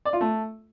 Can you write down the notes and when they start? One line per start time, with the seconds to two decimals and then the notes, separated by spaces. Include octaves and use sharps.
0.05 D5
0.13 F4
0.21 A3